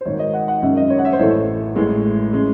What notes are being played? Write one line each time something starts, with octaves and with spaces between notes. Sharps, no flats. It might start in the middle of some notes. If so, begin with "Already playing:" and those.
C5
G#1 G#2 D#3 C#5
D#5
F#5
F#5
G#1 F#2 C#3 E5
D#5
C#5
F#5
E5
C5
A1 A2 E3 A3 C#5
A1 A2 G#3
C#3 G#3